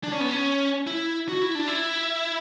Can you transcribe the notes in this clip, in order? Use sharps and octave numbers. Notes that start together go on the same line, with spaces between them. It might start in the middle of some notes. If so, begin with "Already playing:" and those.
D4
C#4
B3
C#4
E4
F#4
E4
D4
E4